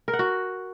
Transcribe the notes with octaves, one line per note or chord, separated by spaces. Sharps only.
A#4
F#5
F#4